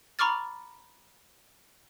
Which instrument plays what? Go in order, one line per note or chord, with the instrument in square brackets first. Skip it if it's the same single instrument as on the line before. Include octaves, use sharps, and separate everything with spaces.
[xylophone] A#5 B5 C#6 D6 F6 A6